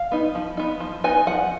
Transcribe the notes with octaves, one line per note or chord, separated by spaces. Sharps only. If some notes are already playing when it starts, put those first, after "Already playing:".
Already playing: F5
B3 D#4
F3
B3 D#4
F3
B3 D#4 G#5
F3 F#5